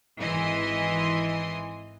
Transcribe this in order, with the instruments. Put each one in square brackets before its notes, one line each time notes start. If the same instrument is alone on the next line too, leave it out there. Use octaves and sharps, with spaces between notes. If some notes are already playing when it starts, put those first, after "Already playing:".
[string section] G#1 E3 D#5 G#5 C6